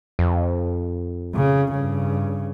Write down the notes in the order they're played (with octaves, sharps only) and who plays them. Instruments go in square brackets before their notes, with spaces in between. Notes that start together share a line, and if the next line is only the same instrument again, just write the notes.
[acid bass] F2
[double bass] C#3
G2 C#3